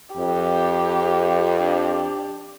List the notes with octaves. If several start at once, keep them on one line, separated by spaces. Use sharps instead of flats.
F2 G4
D4 G4